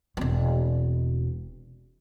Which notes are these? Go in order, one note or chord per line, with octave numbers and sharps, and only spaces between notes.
E1 C4